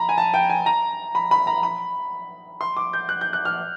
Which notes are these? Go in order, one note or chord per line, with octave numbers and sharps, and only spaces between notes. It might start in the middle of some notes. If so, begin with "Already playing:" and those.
Already playing: A#5 B5
G#5
A5
G5
G#5
A#5
B5
B5
A#5
B5
C6
D6
G6
F#6
G6
F#6
F6